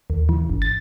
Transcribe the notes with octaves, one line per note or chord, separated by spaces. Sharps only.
D#2
E3
G1
A6